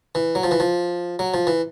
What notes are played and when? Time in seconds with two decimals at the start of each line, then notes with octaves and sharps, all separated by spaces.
0.15 E3
0.35 F#3
0.44 F3
0.51 E3
0.60 F3
1.19 F#3
1.34 F3
1.47 E3